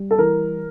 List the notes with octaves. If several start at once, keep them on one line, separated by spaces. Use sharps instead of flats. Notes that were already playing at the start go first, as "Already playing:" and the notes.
Already playing: G3
A4
E3 A#4